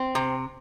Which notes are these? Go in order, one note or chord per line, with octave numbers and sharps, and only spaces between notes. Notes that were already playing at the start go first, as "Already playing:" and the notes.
Already playing: C4
C3